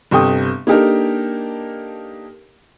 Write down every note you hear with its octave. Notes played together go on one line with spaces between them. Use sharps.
G1 C3 A4 G5 D#6
A#3 D4 D#4 G4 A4 A#4